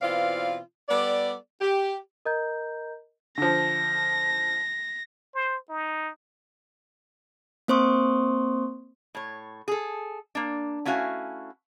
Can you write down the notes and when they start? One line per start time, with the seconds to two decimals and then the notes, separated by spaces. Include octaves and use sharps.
0.02 B2 E3 C4 F4 D5 F5
0.89 G3 B3 A4 D5
1.61 G4
2.25 A#4 D#5 A#5 G6
3.38 D3 F3 A#6
5.35 C5
5.69 D#4
7.68 A#3 C4 C5 C6 C#6 D#6
9.15 A2 C#5
9.68 G#4 A4
10.35 A#3 D4
10.85 A3 C#4 E4 F#4 F5 G#5